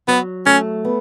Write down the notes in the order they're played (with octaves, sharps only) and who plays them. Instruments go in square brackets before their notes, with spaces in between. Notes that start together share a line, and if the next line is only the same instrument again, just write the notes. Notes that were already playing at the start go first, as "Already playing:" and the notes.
[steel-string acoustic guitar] F#3 [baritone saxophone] B3
[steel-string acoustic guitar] A3 [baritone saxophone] C#4
[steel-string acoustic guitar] B3